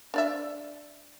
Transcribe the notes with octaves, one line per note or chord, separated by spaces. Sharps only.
D4 D5 E5